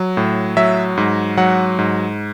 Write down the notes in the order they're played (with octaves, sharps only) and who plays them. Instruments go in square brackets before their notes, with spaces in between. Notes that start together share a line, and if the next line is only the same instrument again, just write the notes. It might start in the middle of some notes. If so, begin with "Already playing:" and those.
Already playing: [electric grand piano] F#3
A2
F#3 E5
G#2
F#3 F#5
G#2